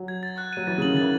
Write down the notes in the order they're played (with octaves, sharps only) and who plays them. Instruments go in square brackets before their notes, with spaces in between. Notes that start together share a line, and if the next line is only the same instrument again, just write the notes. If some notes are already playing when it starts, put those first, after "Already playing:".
Already playing: [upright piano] F#3
[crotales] G#6
A6
F#6
[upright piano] F#3 [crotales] D#7
[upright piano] E3 [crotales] A6
[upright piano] C#3
[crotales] F#7
[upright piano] D#3
[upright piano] E3 [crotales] A6